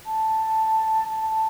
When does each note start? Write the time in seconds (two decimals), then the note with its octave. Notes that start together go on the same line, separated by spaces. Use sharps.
0.06 A5
1.08 A5